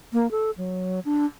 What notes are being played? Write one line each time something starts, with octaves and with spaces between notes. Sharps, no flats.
A#3
A4
F#3
D4